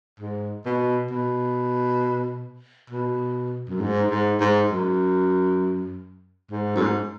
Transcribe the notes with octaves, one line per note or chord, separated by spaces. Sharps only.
G#2
B2
B2
B2
F#2
G#2
G#2
G#2
F#2
G#2
F#2
G#2